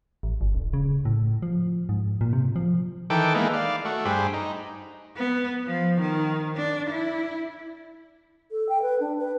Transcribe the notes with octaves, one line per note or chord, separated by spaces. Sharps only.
A1
G1
D1
C#3
A2
F3
G#2
A#2
C3
F3
D#3 E3 A4 G5 D6
G#3 A#3 B3 D#4 E4
D5 F5
A3 F#4
G2 G4 G#4 C5 B5
D#4
B3
F3
D#3
D4
E4
A4
G5
B4
D4
B4